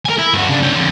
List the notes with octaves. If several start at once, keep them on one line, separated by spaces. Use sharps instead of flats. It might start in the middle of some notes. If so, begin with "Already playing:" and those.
A#4 G#5
E4
G2 F#4
C#3 D4
C#4 G5
F2 D3